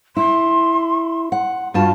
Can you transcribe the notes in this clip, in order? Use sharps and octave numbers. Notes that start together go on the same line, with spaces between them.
E4 C6
F#5
G2 F4 F#4 A5